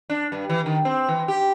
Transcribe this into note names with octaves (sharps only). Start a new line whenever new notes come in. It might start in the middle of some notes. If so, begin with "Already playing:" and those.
D4
G2
E3
D#3
C4
E3
G4